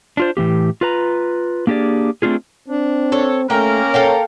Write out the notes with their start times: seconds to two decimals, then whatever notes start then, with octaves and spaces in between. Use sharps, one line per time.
0.17 D4 F4 C5
0.37 A2 E3 A#3 G4
0.81 F4 B4 A#5
1.67 A#3 D4 G4 G#4 D5
2.22 A3 C4 D4 F4 G#4
2.68 C4 D4
3.12 A4 C#5
3.50 A3 A#3 C#4 A#4 G5
3.94 A4 C#5 F5 G5